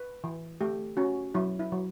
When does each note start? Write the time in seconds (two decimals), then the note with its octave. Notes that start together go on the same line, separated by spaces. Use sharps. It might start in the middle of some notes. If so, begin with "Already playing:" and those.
Already playing: B4
0.24 E3
0.61 A3 G4
0.97 C#4 F#4
1.35 F#3 E4
1.59 E4
1.72 F#3